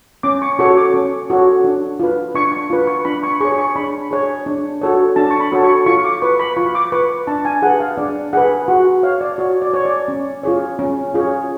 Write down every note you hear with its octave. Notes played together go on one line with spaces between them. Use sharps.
C#4 D6
C#6
F#4 A4 C#5 C#6
D6
C#4
F#4 A4 C#5
D4
F4 B4
D4 C#6
C#6
F4 B4
C#6
D4 B5
C#6
G#4 C#5 C#6
C#6
D4 B5
G#4 C#5
D4
F#4 A4 C#5
D4 A5
C#6
B5
F#4 A4 C#5
C#6
F4 C#6
D6
B4 C#6
B5
F4 C#6
D6
B4 C#6
D4 A5
G#5
G#4 B4 F#5
F5
D4 D5
G#4 B4 F#5
F#4 F#5
C#5 F5
D5
F#4 C#5
D5
C#5
D5
C#4
F4 G#4 C#5
C#4
F4 G#4 C#5